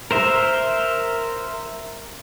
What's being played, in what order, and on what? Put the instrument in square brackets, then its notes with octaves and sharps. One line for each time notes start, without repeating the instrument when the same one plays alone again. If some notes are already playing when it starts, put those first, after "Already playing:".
[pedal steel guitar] A#4 C5 E5